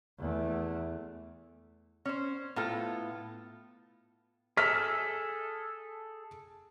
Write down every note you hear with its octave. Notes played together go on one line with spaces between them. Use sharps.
E2 A3
C#4 C5
A2 B3 F4 A4
G#4 A4 F6 B6